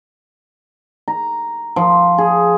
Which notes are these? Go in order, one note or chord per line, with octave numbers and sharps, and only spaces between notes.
A#5
F3
G#4